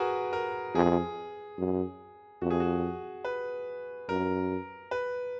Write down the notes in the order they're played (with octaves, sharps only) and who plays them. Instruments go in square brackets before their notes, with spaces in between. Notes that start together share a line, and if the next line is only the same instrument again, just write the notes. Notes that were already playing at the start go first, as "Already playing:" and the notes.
Already playing: [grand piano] F#4 G#4 A#4 B4
A#4
[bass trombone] F2 [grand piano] G#4
[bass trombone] F#2
[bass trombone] F2 [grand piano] F#4
[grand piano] G#4
F#4
B4
[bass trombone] F#2 [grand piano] A#4
[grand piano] B4